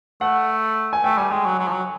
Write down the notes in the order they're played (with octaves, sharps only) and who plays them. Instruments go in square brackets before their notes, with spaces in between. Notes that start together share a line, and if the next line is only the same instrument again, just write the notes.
[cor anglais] A3 [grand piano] F#5
[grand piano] G#5
[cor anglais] A3 [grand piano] G5
[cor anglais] G3 [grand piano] G#5
[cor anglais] G#3 [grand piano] G5
[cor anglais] F#3
F#3
F3
F#3